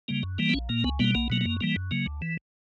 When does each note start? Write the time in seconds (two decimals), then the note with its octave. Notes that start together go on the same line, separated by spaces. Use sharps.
0.08 C#3 G3 A#3
0.23 F#2
0.38 E3 G3 A#3
0.49 B3
0.54 A#1 C#4
0.69 A#2 A#3
0.84 C#2 B3
0.99 B2 G3 A#3 B3
1.15 B1 A#3
1.30 B2 F#3 A#3
1.41 F#2 A#3
1.61 E3 G3 A#3
1.76 F#2
1.91 C#3 F#3 A#3
2.06 D2
2.22 E3